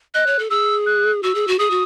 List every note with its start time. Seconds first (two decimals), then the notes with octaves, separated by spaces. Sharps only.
0.14 D#5 F#6
0.27 C#5
0.39 A4
0.50 G#4 E6
0.86 F#6
1.23 F#4 E6
1.35 G#4
1.48 F#4
1.59 G#4 D#6
1.71 F#4